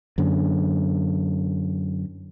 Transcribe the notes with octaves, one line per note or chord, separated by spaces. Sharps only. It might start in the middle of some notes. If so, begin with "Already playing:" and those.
F#2 D3